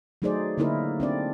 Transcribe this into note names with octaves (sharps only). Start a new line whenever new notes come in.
F#3 A3 D#4 G#4 C5 D5
D3 A#3 D#4 E4 A#4
C4 D4 D5